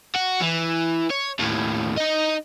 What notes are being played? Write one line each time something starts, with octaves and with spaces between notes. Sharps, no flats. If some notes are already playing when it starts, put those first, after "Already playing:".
F#4
E3
C#5
D#2 A2
D#4 D#5